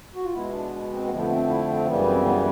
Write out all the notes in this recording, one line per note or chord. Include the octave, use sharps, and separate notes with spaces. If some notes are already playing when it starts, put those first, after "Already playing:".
F#4
F4
B2 G#3 B3 E4
D4
C4
C4
F2 D3 F3 A3 B3
C4
E4
C4
F#2 C#3 E3 G3 B3
C4
B3